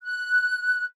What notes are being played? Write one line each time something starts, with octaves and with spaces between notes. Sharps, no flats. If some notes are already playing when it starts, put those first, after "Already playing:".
F#6